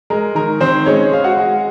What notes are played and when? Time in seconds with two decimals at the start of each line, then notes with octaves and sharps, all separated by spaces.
0.10 G#3 A#4
0.35 D#3 A#4
0.60 D#3 C4 C5
0.86 G#3 C#4 C#5
1.12 G#3 F5
1.24 F#4 F#5
1.37 G#3